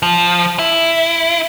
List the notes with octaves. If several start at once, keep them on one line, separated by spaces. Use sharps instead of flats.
F3
E4